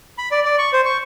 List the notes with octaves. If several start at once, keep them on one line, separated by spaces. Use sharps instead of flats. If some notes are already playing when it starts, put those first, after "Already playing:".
B5
D5
D5
C#6
C5
C#6